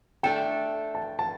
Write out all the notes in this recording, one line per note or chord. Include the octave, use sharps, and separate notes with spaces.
A3 D4 A4 G5
A5
A5